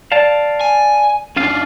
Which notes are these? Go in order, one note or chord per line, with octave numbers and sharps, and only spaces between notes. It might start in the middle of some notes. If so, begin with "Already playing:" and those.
D5 F5 A5 D7
G#5
F#2 C#4 D4 F4 F5